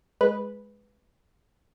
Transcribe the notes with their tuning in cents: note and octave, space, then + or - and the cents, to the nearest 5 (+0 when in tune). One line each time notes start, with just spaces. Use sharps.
G#3 +0 B4 +0